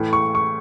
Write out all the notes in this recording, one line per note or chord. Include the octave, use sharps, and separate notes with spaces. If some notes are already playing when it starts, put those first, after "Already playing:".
Already playing: A2 E3 A3
C#6
C#6